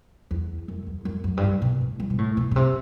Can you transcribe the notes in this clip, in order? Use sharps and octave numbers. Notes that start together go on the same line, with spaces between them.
E2
F#2
E2
F#2
F#2
G2
A2
B2
A2
G2
B2
A2
B2
B2
C3